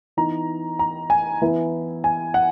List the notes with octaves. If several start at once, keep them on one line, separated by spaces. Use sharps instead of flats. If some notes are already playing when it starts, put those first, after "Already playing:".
E3 B3 D#4 A#5
A#5
G#5
E3 B3 E4
G#5
F#5